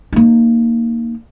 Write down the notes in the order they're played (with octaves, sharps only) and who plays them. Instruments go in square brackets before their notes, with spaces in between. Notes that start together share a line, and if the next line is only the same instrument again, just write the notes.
[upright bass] A#3 D#4